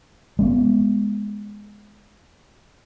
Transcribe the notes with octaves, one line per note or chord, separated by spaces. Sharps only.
G#3 A#3 B3